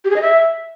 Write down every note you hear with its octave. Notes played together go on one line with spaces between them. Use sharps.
G4
G#4
D#5
E5